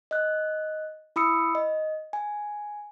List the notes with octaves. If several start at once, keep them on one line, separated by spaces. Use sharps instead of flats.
D#5 F#6
E4 B5 D#6 E6 C#7
D#5
G#5